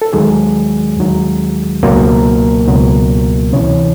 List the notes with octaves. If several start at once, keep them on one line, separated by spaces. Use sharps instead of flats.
A4
D#2 D#3 F#3 G#3 G#4
D#2 D#3 F#3
C#2 B2 F#3 A#3 A#4
C#2 B2 F#3
D2 C3 E3 C#4 C#5